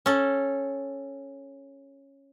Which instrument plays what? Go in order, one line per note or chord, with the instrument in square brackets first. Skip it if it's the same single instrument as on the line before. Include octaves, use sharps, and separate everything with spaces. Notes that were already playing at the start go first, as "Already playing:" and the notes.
[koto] C#4 A4